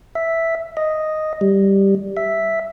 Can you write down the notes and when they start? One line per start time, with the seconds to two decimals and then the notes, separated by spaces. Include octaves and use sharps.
0.15 E5
0.77 D#5
1.41 G3
2.17 E5